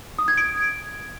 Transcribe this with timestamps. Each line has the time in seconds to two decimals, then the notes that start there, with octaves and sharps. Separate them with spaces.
0.19 D#6
0.28 G#6
0.37 D7